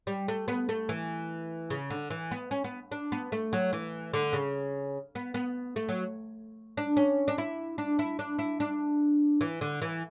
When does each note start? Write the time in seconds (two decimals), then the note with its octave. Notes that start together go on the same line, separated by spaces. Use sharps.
0.07 G3
0.28 A3
0.48 B3
0.69 A3
0.89 E3
1.70 C#3
1.90 D3
2.10 E3
2.31 B3
2.51 C#4
2.64 B3
2.92 D4
3.12 B3
3.32 A3
3.53 F#3
3.73 E3
4.14 D3
4.33 C#3
5.15 B3
5.34 B3
5.76 A3
5.89 F#3
6.77 D4
6.97 C#4
7.28 D4
7.38 E4
7.78 D4
7.99 E4
8.19 D4
8.39 E4
8.60 D4
9.41 E3
9.61 D3
9.82 E3